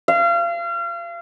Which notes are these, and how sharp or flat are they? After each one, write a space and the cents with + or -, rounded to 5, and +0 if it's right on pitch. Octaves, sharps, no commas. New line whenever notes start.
F5 -35